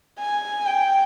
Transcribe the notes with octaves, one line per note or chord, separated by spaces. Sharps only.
G#5
G5